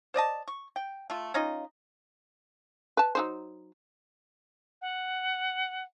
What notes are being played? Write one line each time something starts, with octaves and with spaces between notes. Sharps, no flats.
C5 D5 D#5 A5
C#6
G5
A3 F4
C#4 D#4 F4 D#5
B4 A5
F#3 D#4 C5
F#5